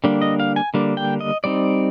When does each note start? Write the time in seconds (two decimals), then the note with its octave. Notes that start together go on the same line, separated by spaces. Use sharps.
0.04 D3 G3 A#3 D4
0.22 D#5
0.40 F5
0.56 G#5
0.74 D3 G3 A#3 D4
0.97 G5
1.21 D#5
1.44 G3 C4 D#4 D5